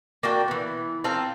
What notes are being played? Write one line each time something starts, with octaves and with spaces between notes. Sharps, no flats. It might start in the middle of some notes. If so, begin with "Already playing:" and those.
A#3 D4 F#4 G5
E3 B3
C4 F4 A4 A#4